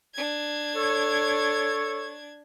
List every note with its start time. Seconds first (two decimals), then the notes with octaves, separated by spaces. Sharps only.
0.14 D4 G#6
0.76 A4 C#5